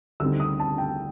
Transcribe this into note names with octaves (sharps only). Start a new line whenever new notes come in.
D2 D3 G3 C4 D#4 E6
D#6
A5
G5